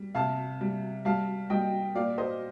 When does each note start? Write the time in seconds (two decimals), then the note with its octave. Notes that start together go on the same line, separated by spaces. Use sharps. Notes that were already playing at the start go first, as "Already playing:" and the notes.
Already playing: G3
0.15 C3 F5 A5
0.61 G3
1.05 G3 F5 A5
1.50 G3 D#5 G5
1.95 A#2 D5 F5
2.18 C5 D#5